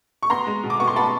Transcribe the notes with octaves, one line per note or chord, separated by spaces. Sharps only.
C#6
B3 A#5 C6
G#3
B2
D6
B3 C#6
C6
B3 A5 B5